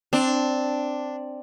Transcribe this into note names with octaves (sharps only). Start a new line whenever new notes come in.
C4 D4